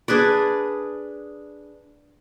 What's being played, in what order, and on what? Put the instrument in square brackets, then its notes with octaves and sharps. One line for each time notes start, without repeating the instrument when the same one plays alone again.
[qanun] D4 G#4 B4 D5